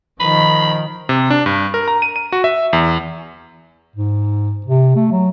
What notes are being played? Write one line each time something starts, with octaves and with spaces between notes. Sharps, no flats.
D#3 F3 B5
C3
D4
G2
A#4
A#5
D#7
D#7
F#4
E5
E2
G#2
C3
A3
F#3